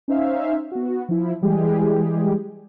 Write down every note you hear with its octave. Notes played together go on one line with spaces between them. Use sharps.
C#4 D#4 C5 E5 F5
B3 F#4
F3 E4
E3 G3 G#3 G4 G#4